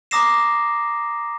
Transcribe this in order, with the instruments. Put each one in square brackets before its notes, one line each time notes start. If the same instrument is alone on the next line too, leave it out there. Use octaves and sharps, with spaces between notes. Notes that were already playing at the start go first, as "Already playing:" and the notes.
[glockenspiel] A#5 D6 D#6 A#6 C7 E7